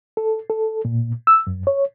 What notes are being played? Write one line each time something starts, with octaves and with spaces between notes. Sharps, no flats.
A4
A4
A#2
E6
F#2
C#5